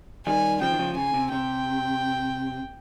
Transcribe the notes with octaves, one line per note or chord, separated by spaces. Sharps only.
D#3 G3 G#5
C#3 F3 G5
D#3
C#3 F3
C#3 G#5
C3
C3 G5